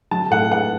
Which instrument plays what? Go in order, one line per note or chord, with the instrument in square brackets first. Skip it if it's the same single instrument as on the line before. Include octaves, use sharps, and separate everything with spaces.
[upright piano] F#3 A5
A2 F#5
B3 F#5